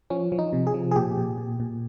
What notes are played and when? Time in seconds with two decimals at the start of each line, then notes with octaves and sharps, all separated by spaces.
0.10 F3 C#4
0.32 F3
0.39 D#4
0.53 C3
0.67 G#4
0.74 F3
0.91 G#4
0.96 A#2 G4
1.17 A#2
1.38 A#2
1.60 A#2